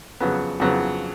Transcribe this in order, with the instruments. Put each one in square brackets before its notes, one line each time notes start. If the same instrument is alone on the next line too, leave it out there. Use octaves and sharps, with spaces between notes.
[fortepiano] F2 C#3 F#3 B3
F2 C#3 F#3 B3